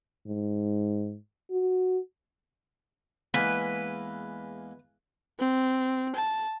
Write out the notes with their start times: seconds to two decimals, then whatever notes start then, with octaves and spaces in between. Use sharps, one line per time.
0.27 G#2
1.51 F#4
3.34 E2 G#3 A#3 B4
5.40 C4
6.16 A5